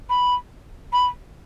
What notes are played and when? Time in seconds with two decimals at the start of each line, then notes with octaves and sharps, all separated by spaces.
0.10 B5
0.93 B5